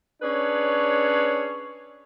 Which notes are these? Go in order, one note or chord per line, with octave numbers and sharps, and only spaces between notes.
C#4 D4 G#4 B4 C#5